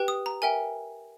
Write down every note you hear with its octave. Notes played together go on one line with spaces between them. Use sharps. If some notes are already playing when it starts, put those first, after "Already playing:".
Already playing: G4 B4 G5
D#6
A#5
A#4 E5 G5 G#5